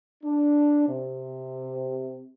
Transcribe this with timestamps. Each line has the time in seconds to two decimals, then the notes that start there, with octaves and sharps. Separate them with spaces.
0.23 D4
0.87 C3